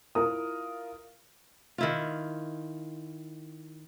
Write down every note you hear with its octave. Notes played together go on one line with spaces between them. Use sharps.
E4 F4 A#4 D#6
D#3 E4 F4